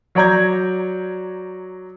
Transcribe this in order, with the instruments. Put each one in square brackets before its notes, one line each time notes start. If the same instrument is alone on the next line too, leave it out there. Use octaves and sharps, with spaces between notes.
[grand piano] F#3 C#5 D5 A#5 G6 G#6